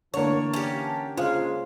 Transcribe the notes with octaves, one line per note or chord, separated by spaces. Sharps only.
D3 E3 A#3 C#5 A5
C#4 G4
C#3 G#3 F4 C5 F5